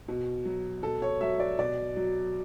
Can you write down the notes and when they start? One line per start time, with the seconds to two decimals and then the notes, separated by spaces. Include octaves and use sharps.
0.08 B2
0.45 F#3
0.83 B2 A4
1.02 C#5
1.21 F#3 E5
1.40 D5
1.59 B2 D5
1.96 F#3